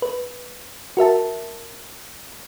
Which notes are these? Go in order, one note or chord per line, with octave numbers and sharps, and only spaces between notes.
B4
F#4 A#4 E5 A5